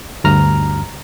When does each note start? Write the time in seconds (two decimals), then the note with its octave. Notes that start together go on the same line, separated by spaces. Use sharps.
0.24 D2 G2 A#5 F6